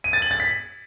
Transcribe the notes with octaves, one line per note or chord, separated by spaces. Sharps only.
D#7
A6
F#7
A6
B6